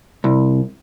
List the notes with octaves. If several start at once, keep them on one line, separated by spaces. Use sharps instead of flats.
C2